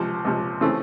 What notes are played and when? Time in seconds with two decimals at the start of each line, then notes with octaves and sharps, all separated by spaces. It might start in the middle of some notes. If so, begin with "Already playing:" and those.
Already playing: C#2 C3 F3
0.25 C#2 C3 F3
0.61 C#3 E3 A3 C4